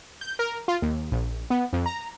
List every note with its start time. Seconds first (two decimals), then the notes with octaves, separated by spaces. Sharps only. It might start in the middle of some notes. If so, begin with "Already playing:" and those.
0.21 G6
0.39 A#4
0.68 F4
0.82 D#2
1.12 A#1
1.50 B3
1.73 F2
1.86 A#5